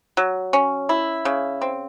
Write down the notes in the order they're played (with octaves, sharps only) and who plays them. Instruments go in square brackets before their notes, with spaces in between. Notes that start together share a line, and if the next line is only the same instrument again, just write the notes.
[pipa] F#3
C#4
E4
C#3
C4